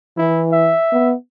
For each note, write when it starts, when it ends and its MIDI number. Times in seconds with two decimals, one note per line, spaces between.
0.18 0.74 52
0.18 0.44 64
0.51 1.13 76
0.92 1.14 59